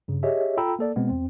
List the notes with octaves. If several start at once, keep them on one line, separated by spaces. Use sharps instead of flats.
G2 C#3
G4 G#4 C#5 D#5 E5
F4 A4 G5 A#5 B5 E6
A#3 A4 D5
B2 G#3 B3 C4
E2 C4